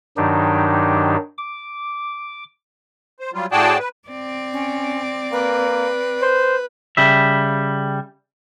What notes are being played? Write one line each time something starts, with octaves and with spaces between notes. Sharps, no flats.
G2 D#3 F#3 D4 D#4 G4
D6
C5
F#3 G3 F4
A2 F#4 G#4 D5 G5 A5
B4
C4 D5
C#4
A#3 B4
C5
C#3 G3 E5